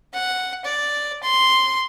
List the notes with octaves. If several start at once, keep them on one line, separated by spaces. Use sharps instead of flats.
F#5
D5
C6